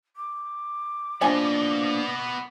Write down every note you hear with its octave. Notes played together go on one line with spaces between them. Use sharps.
D6
F3 A#3 B3 D4 D5 D#5 G#5